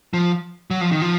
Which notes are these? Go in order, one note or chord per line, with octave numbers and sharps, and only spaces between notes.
F3
F#3
F3
D#3
F3